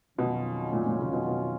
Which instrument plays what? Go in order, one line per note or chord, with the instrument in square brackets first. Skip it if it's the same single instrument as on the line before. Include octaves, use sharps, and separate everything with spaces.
[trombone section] F2 D#3 F#3 C#4 F4 [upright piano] B2
[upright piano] A#2
A#2
C#3
B2
B2